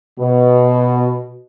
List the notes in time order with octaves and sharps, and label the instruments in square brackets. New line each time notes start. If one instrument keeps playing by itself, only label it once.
[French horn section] B2